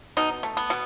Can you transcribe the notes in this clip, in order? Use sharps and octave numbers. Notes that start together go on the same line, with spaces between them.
B2 D#4
A3
B3
B2